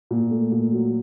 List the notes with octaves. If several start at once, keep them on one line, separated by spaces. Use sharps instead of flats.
A#2
A3
A#2
F#3